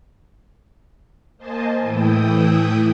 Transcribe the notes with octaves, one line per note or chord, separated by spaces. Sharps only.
A#3 C5 D#5 G#5 A5
A2 E3 E4 G5 D#6